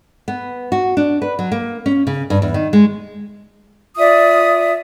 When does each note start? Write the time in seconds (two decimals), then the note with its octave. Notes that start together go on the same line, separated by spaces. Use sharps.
0.28 B3
0.72 F#4
0.97 D4
1.22 B4
1.39 F#3
1.52 A#3
1.86 C#4
2.07 C#3
2.30 G2
2.42 E2
2.54 D#3
2.73 G#3
3.96 F4 D5 E5 D#6